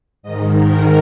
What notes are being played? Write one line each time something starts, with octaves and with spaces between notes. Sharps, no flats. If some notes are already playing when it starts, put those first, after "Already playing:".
G#2 D#3 D#5
A#4